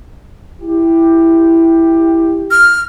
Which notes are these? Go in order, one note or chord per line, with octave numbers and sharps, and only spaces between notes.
E4 G4
F6